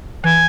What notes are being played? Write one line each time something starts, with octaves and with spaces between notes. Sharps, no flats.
E3 G#5